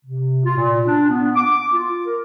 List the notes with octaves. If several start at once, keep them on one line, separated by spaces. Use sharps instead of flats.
C3
F4
A#2
D4
B3
D6
F4
A#4